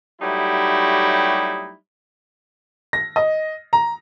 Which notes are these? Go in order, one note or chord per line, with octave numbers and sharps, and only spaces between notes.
F#3 G3 A3 D#4 E4 G4
A#6
D#5
A#5